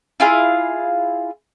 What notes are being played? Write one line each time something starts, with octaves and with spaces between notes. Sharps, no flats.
E4 F4 G#4 F5